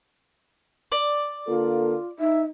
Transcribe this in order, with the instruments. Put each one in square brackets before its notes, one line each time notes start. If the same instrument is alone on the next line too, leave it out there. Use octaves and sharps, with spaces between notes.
[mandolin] D5
[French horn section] D3 A#3 A4 [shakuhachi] F4
[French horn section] D#4 [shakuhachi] E5